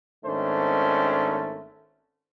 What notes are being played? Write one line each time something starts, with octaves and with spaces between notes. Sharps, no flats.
G#1 D#3 A3 C#4 D4 C5